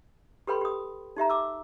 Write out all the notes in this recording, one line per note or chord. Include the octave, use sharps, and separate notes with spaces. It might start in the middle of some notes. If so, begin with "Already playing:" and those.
G4 A4 B4 G5 B5 C6
G4 D#6
D#4 G4 E5 A#5
D6 E6